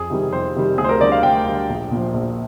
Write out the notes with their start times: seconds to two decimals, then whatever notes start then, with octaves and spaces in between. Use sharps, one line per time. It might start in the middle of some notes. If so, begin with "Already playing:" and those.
Already playing: F2 G#4
0.10 C3 D#3 G3
0.32 F2 C5
0.55 C3 D#3 G3
0.78 D2 G#4
0.84 C5
0.89 A#4
1.01 D3 G3 D5
1.12 F5
1.23 D2 G5
1.46 D3 G3
1.69 A#1
1.91 A#2 F3
2.14 A#1